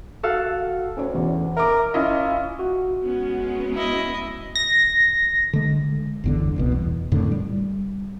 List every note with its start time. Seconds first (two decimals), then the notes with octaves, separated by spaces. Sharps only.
0.23 F#4 A4 F5
0.97 D2 C#4 C#5
1.15 E2
1.56 A#4 E5 D6
1.94 C#4 E4 F4 D#5
2.59 F#4
3.03 G#3 B3 C#4
3.74 E4 D#5
4.55 A#6
5.53 D3 G#3
6.24 G1 E2 D3
6.56 D#1 C2 B2
6.72 E2
7.12 F2 A2 D3 D#3
7.32 G3